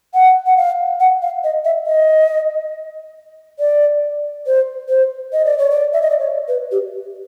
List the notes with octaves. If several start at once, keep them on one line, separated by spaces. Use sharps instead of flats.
F#5
F#5
F5
F#5
F5
D#5
E5
D#5
D5
C5
C5
D#5
D5
C#5
D5
E5
D#5
D5
C#5
B4
G4